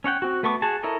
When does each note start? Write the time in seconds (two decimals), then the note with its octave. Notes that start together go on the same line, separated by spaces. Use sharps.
0.04 C#4 C#5 F#5 G5
0.22 C4 F#4
0.43 A3 B3 A4 C#6 D6
0.62 F#4 G#4 A5
0.83 E4 A4 A#4 C#5 D#5